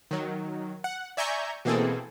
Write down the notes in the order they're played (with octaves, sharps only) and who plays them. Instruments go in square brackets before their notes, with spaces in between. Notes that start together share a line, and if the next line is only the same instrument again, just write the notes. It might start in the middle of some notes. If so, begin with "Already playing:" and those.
[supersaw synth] D#3 F#3
F#5
D5 E5 G#5 A#5 C#6 G6
B2 E3 A#3 C4 G#4 A4